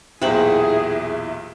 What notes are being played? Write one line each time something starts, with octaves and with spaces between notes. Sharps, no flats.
B1 E2 A#2 E4 G4 G#4 C5 F#5